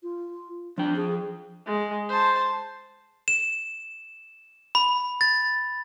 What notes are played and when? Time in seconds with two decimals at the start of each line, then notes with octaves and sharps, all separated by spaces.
0.03 F4
0.78 F3 D4 G5
0.96 G#4
1.66 G#3
2.09 C5 A5
3.28 E7
4.75 B5
5.21 A6